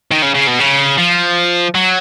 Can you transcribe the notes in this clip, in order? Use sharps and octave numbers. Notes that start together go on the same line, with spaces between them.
D#3
C#3
C#3
B2
C#3
F3
F#3